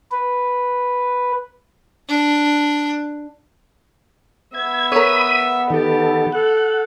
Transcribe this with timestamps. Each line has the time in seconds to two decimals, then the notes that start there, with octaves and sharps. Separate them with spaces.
0.12 B4
2.08 D4
4.54 B3 E5 G#6
4.92 A#4 B4 C#5 B5 D#6
5.70 D#3 G4 A4
6.32 A4 F#5